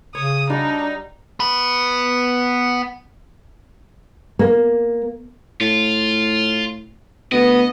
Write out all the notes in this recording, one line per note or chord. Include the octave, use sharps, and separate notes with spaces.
C#3 C#5 D#6
G3 D4 D#4 F#4
B3 B5
A#3
A2 F4
D2 B3 D#5